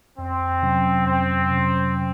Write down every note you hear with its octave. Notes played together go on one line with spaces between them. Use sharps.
F2 C4
C3 F#3 C#4
F2 C4
C3 F#3 C#4